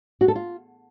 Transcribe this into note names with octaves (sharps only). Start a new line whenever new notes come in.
F#4
A4
F4